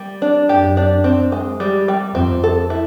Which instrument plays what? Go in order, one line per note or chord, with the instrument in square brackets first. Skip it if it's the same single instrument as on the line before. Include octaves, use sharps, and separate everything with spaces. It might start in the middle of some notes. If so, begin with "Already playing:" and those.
Already playing: [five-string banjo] G3
D4
[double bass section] F#2 [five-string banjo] G4
[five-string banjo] D4
C4
G#3
G3
G3
[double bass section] F2 [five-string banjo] C4
[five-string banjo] A4
E4